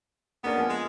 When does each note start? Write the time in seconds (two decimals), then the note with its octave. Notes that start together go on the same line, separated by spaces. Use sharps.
0.44 A#3 B3 C#4 D4
0.57 F3 A#3 G#5
0.69 G#3